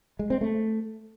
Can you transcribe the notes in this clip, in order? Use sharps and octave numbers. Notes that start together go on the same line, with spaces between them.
G#3
C4
A3